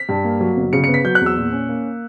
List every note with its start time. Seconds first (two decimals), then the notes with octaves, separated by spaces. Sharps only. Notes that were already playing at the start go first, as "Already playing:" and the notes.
Already playing: B6
0.09 G2
0.24 A#3
0.41 F#3
0.57 G1
0.73 C#3 C#7
0.84 C#7
0.89 B3
0.94 B6
1.04 F#3 G6
1.15 F#6
1.21 E2
1.26 E6
1.37 A#2
1.52 C#4
1.69 A#3